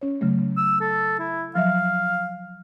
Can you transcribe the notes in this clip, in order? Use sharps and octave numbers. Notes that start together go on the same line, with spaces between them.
C#4 C#5
C#3 F#3 A3
E6
A4
E4
F3 F#3 E5 F5